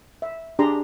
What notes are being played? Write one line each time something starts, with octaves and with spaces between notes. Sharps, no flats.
E5
D4 G4 G#4 A#5 C6